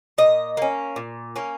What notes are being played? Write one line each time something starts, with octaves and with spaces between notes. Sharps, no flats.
A#2 D#5
A#3 C#4
A#2
A#3 C#4